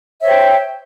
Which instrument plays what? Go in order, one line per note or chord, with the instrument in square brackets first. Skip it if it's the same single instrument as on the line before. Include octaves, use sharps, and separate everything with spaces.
[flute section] E5
C#5
C5
G5